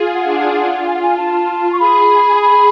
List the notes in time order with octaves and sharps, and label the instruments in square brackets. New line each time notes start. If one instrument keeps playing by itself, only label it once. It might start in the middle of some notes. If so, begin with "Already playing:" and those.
Already playing: [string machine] F4 G#4
[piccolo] F#5
[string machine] D4
[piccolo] F#5
[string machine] F4 [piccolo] F#5
[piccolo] G#5
F#5
G#5
[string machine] F4 [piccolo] A5
[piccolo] C#6
[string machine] G#4 [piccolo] B5
[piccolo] B5